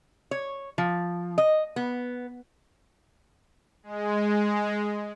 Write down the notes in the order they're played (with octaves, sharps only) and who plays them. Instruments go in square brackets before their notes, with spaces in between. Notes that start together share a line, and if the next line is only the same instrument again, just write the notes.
[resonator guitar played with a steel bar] C#5
F3
D#5
B3
[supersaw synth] G#3